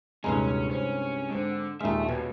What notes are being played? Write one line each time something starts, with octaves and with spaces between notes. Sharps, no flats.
D#1 C2 G2 G#3 C#4 D#5 A#5
C#4 C5
G#2 D3 C4
D#2 A#2 G#3 D#4 E5 A5 F6
C#2 B2